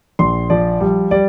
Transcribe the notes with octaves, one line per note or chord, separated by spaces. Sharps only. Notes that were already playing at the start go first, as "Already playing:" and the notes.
A#1 C6
F3 D5
G3
G3 D5